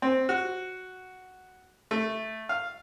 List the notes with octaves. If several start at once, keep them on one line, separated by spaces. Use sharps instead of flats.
C4
F#4
A3
F5